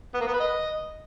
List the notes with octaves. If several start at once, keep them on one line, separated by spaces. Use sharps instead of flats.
B3
A#3
B3
B4
D#5